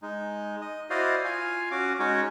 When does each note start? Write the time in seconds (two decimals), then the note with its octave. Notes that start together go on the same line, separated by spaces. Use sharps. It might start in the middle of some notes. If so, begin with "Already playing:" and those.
0.02 G#3 D#4
0.61 D#5
0.90 E4 F#4 C5 D5 D#5 F5
1.24 F4 F5 G#5
1.71 C#4 F#4 D6
1.99 G#3 C#4 D#4 F#4 C#5